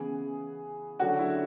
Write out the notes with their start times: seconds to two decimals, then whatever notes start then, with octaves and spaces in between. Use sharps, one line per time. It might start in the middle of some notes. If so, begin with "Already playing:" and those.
Already playing: C#3 E3 B3 G#4
0.99 D3 F#3 A3 D4 F#4
1.19 E4